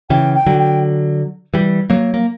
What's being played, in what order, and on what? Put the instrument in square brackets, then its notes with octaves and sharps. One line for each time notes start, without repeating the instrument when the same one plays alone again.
[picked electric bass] C#3 E3 [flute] G5
[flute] G5
[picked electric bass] D3 F#3
[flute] G5
[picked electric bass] E3 G3
F#3 A#3
A#3